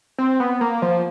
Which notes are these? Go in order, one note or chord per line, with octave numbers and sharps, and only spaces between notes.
C4
B3
A#3
F3